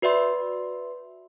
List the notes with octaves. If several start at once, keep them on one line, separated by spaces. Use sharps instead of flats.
F#4 B4 D5 E5 C6